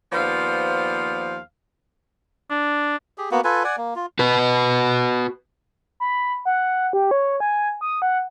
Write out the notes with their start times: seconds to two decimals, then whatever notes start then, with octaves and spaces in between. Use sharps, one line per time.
0.13 D#2 F3 B3 C5 D5 F5
2.51 D4
3.18 G4 G#4
3.31 A#3 B3 F#4
3.44 F4 A4 B4 G#5
3.64 D5 F#5 G#5
3.77 A#3
3.96 F4
4.19 F#4 B4
6.00 B5
6.45 F#5
6.93 G4
7.11 C#5
7.40 G#5
7.81 D#6
8.02 F#5